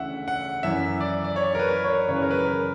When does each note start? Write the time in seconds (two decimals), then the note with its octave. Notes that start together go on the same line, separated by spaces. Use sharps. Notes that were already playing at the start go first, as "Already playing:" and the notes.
Already playing: D2 C#3 E3 E5 F#5
0.28 F#5
0.63 F#2 E3 E5
1.00 D5
1.24 D5
1.36 C#5
1.55 A#4
1.59 B4
1.84 C#5
2.08 F#2 C#3 E3 C#5
2.16 B4
2.22 A#4
2.31 B4
2.45 A#4